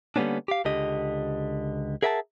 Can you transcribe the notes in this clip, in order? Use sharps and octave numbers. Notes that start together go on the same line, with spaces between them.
D3 G3 A#3 B3 C#4 D4
G4 F5
C#2 D3 G4 D#5
G#4 A#4 E5 F#5 G#5 A5